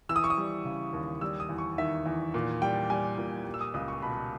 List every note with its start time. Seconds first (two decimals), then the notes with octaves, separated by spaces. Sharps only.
0.09 E3 E6
0.16 D#6
0.24 C#6
0.30 D#6
0.38 G3
0.65 C#3
0.93 D#2
1.21 G3 E6
1.40 D#6
1.49 E2
1.58 C#6
1.78 D#3 E5
2.06 E2
2.34 A#2
2.62 G3 G5
2.90 G3 G#5
3.18 A#2
3.46 G3
3.54 E6
3.61 D#6
3.74 C#2 D#6
3.88 C#6
4.02 B2 B5